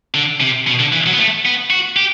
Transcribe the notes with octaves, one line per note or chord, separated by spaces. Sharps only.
D3
C3
B2
D3
E3
F#3
B3
A3
B3
F#4
G4